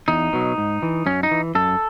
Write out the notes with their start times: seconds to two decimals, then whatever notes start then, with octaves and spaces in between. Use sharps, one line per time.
0.08 E2 D#4
0.33 B2 F#3
0.58 G#2
0.83 E3
1.06 F#2 C#4
1.23 D#4
1.31 E3
1.55 F#2 A4